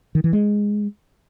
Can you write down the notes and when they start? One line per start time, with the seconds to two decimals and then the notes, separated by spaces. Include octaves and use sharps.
0.15 D#3
0.24 E3
0.33 G#3